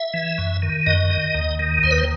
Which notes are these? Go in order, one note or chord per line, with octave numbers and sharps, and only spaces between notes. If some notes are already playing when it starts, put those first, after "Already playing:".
Already playing: E5
E3
F#2
D#3
F#2 D#5
D#3
D#2
D#3
D#2 C5
B4
C5